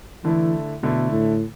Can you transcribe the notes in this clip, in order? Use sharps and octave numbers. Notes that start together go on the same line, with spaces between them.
D3 E3 A3 E4
B2 D3 A3 E4
A2